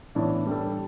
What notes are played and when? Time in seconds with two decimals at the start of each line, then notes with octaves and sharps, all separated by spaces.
0.15 A2 E3 B3 D4
0.46 G3 D4 A4